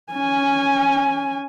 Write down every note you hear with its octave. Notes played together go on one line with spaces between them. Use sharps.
C#4 G#5